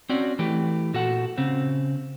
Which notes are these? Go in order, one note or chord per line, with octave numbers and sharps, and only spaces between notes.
C4 C#4 F#4 D5
E3 A3 G4
A#2 F#4 A4 F#5
C#3 C4